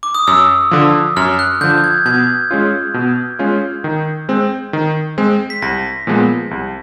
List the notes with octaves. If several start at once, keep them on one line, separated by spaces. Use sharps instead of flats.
D6
D#6
F#2 E6
D3 F3
F#2 F6
F#6
D3 F3 G6
G#6
B2 G#6
G#3 C#4 F4
B2
G#3 C#4 F4
D#3
G#3 C4
D#3
G#3 C4
B6
C2 A#6
A#2 F3 G#3 B3
C2